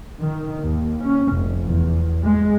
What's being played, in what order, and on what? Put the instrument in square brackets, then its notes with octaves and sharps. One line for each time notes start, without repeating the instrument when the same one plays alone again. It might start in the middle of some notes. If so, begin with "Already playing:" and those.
[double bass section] D#3
D#2
C#4
F1
E2
G#3